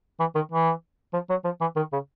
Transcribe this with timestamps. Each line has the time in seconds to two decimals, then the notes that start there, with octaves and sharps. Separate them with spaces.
0.20 E3
0.35 D#3
0.51 E3
1.13 F3
1.30 F#3
1.45 F3
1.61 E3
1.76 D#3
1.93 C#3